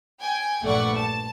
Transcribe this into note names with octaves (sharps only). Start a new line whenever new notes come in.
G5 G#5
A#1 G2 A3 D5 F#5 C#6
A5